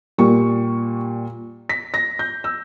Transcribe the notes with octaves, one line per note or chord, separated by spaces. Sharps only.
A#2 G3 A#3 C#6
B6
A#6
G6
E6